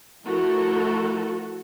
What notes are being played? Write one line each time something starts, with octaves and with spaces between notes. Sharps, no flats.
F3 A3 E4 F#4 A4 A#4